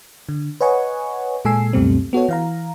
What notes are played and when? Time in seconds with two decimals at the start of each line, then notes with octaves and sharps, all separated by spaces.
0.29 D3
0.61 B4 C#5 D#5 F#5 G#5 C#6
1.45 A#2 G#3 A4 G#5 E6 C7
1.73 C#2 F#2 B2 G3 A3 C4
2.13 B3 F#4 A4 C#5
2.29 E3 F5 A#5